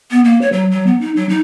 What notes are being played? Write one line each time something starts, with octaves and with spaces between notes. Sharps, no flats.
B3
A#3
C#5
F#3
F#3
B3
D#4
F#3
D#4